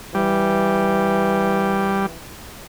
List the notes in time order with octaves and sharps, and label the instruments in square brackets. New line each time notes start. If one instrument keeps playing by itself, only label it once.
[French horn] E3 [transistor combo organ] G3